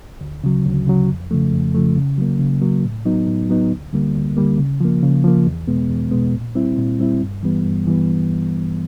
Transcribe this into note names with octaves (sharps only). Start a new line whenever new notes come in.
D2
C#3 F#3
D2
C#3 F#3
F2
C#3 F3 A3
F2
C#3 F3 A3
C#3
F#3 A#3
C#3
F#3 A#3
A2
F#3 B3 D#4
A2
F#3 B3 D#4
D2
D3 G3 A#3
D2
D3 G3 A#3
C#3
F3 A#3
C#3
F3 A#3
E2
B2 G#3 B3
E2
B2 G#3 B3
A#2
G3 C4 E4
A#2
G3 C4 E4
G2
E3 G3 B3
G2
E3 G3 B3